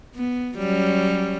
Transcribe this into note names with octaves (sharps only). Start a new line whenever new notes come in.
B3
F#3 G3 C#4